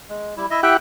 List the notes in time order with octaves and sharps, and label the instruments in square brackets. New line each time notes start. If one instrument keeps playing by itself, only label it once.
[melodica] G#3
G3 E4
E4 D#5 E5
[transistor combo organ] E4 G4 F#5 [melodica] E5 G5